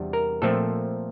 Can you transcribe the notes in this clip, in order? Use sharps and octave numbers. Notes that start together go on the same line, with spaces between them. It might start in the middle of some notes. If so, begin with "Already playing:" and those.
Already playing: E2 C3 G3 D4
A#4
A#2 F3 A3 C4 A4